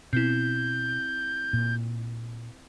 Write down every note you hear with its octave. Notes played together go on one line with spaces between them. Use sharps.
B2 C4 E4 G6
A#2